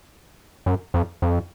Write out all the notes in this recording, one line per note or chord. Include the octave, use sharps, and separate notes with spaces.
F#2
F2
F2